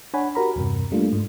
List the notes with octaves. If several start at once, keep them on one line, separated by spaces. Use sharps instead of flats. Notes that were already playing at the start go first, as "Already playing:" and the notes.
D4 C#5 F#5 G#5 B5
F#4 G4 A#4 A#5 B5
E2 G2 C3
G3 A3 A#3 D4 F4
G#2